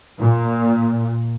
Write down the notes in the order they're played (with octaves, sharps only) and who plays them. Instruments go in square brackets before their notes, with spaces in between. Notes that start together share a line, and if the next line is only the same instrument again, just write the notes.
[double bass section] A#2